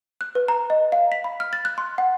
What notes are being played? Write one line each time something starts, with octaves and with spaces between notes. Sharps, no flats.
F#6
B4
A#5
D#5
F5
B6
B5
F6
A6
F#6
C6
F#5